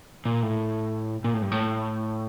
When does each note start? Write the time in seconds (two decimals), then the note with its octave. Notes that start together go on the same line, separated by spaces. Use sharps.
0.25 A#2
0.42 A2
1.24 A#2
1.34 A2
1.42 G2
1.52 A2